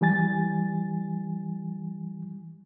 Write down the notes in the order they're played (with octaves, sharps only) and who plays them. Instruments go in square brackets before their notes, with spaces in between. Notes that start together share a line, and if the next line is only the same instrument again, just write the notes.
[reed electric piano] E3 G3 G#5 A6